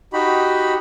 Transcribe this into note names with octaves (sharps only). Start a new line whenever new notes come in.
D#4 F#4 G4 B5